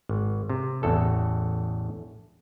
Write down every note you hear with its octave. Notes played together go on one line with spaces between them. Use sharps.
G#1
C3
A1 E2 A4